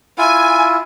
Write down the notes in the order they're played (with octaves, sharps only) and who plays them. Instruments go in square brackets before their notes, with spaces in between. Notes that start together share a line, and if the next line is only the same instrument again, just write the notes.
[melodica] E4 F4 [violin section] G#5